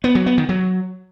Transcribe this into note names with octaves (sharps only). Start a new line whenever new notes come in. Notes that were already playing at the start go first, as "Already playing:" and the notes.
B3
F#3
B3
D#3
F#3